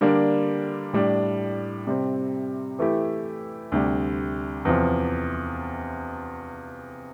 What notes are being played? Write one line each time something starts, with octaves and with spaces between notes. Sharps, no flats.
D3 G3 A#3 D4
A2 G3 D4
C3 G3 C4
E3 A3 E4 G4
D2 C3 G3
E2 C3 F3